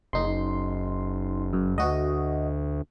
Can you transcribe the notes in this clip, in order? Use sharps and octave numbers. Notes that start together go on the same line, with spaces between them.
F#1 D#4 C6
F#2
D2 F#4 D#5